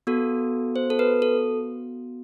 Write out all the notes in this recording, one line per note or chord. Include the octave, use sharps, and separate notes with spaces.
B3 F#4 A4
C5
A4
B4
A4